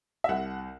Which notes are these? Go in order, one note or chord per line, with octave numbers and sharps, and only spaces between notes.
E5
C2 F#5